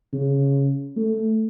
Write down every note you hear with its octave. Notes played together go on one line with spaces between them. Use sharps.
C#3
A3